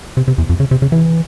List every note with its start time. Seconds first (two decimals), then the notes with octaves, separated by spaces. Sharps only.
0.17 C3
0.28 C3
0.38 E2
0.49 F2
0.60 C#3
0.71 C3
0.82 C#3
0.92 E3